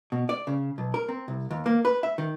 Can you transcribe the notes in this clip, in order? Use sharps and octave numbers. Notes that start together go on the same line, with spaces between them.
B2
D5
C#3
B1
A#4
C4
C2
D#2
A#3
B4
E5
D#3